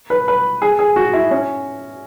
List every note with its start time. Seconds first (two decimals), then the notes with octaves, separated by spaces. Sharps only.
0.10 B4
0.28 B4
0.62 G#4
0.79 G#4
0.96 F#4
1.13 E4
1.31 C#4